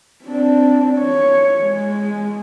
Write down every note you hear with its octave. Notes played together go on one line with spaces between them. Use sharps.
C4 D4
C#5
G#3